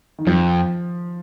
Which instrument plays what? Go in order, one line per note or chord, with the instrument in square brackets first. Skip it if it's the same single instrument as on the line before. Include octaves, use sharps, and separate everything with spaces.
[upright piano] D#3
[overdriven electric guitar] F2 [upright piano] F3